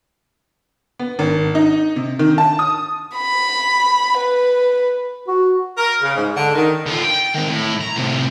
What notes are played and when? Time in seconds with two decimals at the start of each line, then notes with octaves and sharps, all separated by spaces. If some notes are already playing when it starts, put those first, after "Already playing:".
1.00 B3
1.19 G#1
1.55 D#4
1.96 C3
2.19 D#3
2.38 A5
2.59 D#6
3.16 B5
4.18 B4
5.28 F#4
5.78 A#4
6.02 C#3
6.16 G#2
6.37 D3
6.55 D#3
6.86 D3 F4
7.03 G5
7.34 D#3 C4
7.49 A2
7.81 A#5
7.96 A2 C3